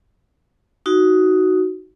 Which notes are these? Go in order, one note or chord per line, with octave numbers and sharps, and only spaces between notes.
D#4 F#4